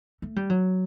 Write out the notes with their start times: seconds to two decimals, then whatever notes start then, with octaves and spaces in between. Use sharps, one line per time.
0.22 A3
0.36 G3
0.50 F#3